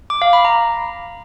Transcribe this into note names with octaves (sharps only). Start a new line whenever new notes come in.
D6
F5
B5
A#5